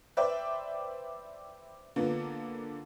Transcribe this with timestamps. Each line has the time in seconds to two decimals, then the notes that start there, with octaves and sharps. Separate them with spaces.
0.17 B4 C5 D5 E5 G5
1.96 D3 A#3 B3 F4